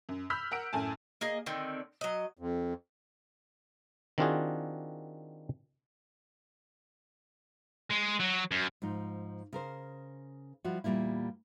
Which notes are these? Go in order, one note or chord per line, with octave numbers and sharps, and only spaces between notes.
F#2
B5 E6 F6 G6 B6
A#4 F#5 E6 D7
F#2 A2 G#5 A5
A#3 G#4 D#5
D3 D#3 C4
F#3 D#5
F2
D#3 C4 D4 F4 F#4 G#4
G#3
F#3
F#2
G#2 F3 D#4
C#3 A#4 C5
F3 G3 E4 F#4
E2 A#2 G3 A#3 E4